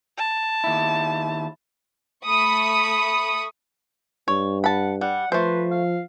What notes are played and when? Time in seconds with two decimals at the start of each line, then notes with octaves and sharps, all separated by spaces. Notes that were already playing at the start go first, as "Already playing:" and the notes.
0.18 A5
0.64 D#2 E4
2.25 A3 B5 C#6 D#6
4.28 G2 C#5
4.64 F#5 A5 B5
5.01 G3 F#5
5.32 F3 A3 B4 C5
5.71 F5